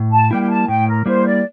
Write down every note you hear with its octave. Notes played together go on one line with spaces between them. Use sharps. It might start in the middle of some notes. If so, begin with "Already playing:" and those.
Already playing: A2
A5
G3 A#3 E4 G5
G5
A5
A2 G5
A#4
G3 A#3 E4 C5
D5